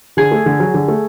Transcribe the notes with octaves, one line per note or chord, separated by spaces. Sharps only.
D3 G#4
A3
D3
F#3
D3
A3